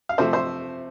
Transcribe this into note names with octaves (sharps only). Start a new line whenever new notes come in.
F5
C3 F3 A3 C5 E5
C5 E5